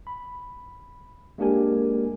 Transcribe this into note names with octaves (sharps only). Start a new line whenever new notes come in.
B5
G#3 A#3 D4 G4 A#4 G#5